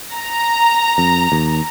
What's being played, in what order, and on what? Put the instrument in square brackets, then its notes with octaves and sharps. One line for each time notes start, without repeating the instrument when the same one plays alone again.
[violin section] A#5
[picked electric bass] F2
D#2